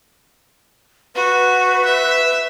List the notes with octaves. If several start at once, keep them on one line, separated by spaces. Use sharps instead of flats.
F#4 B4
E5